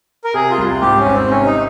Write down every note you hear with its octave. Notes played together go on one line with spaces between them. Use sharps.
A#4
C3 G#4
F4
C2
F4
G#2 G4
C#4
G#1
C4
C3 C#4
D#4